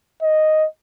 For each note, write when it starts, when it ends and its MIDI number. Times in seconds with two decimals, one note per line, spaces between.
0.22 0.66 75